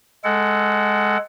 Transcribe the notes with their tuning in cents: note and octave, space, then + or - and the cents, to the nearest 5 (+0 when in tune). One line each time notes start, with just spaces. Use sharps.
G#3 +0 A4 +0 F#5 +25